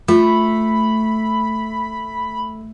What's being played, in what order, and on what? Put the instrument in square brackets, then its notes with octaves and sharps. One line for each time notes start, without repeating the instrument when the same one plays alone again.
[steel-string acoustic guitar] A3 [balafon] F4 [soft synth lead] B5